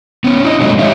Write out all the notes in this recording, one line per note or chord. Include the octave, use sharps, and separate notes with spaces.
B3 C#4
D4 E4 D#5
F#3 G#3 A3 D#4
F3 G4 C#5 D#5 E5